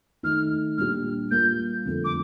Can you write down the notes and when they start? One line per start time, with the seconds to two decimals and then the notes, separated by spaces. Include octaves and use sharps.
0.23 D#3 A3 D#4 F6
0.78 A#2 G3 D4 G4 F6
1.31 G3 A#3 F4 A#4 G6
1.86 F2 D3 F3 A3
2.04 D6